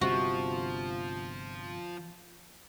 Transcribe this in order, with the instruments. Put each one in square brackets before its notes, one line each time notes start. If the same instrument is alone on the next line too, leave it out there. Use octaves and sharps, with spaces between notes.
[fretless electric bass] G1 C3 [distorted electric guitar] F3 [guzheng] F#4